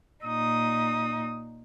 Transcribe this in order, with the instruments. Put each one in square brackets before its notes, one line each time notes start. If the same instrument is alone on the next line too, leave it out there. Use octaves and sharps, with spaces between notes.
[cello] A#2 D#4 [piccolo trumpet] D#6